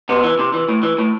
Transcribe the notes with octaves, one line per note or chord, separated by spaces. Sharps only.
C3 B3
E3
C3
E3
A2
E3
A2